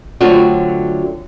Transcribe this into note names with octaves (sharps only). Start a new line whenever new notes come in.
D3 F#3 A3 C4 F4 F#4